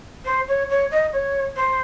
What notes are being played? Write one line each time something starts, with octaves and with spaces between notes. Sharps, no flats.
C5
C#5
C#5
D#5
C#5
C5